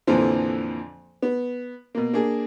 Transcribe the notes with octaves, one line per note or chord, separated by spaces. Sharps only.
F2 A#2 D3 E3 F3
B3
B2 A#3
A#3 D4 G#4